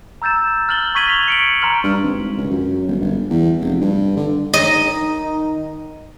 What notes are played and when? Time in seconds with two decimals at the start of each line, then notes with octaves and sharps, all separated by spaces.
0.22 A#5 E6 G6 A6 E7
0.69 F6 A6 F#7 G7
0.95 C#6 G#6 B6 D#7 F#7 G7
1.09 F7
1.28 C#7 D7 F#7
1.62 A#5 C6 F6 F#7
1.83 G2
2.03 G#1
2.37 C#2
2.50 F#2
2.88 G1
3.01 G1
3.30 E2
3.60 F1
3.81 G2
4.17 D3
4.54 D#3 D#4 D#5